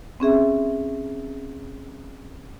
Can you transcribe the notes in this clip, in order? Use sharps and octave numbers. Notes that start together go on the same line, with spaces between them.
C4 C#4 G#4 E5